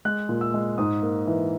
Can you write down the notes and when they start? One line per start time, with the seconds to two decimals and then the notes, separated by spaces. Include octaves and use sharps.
0.05 G#3 F#6
0.29 A#2
0.41 E6
0.54 G#3
0.78 G#2 D#6
1.02 A#3
1.27 E3